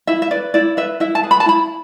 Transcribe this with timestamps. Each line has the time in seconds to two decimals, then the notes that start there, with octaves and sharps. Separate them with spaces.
0.07 E4 E5
0.22 E5
0.31 B4 D5
0.54 E4 D5
0.77 B4 E5
1.00 E4 E5
1.15 A5
1.23 G#4 B4
1.31 B5
1.40 A5
1.46 E4 B5